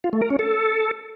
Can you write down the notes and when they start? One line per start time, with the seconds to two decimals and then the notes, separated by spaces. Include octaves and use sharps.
0.04 F4
0.13 A3
0.22 A#4
0.30 C#4
0.39 A4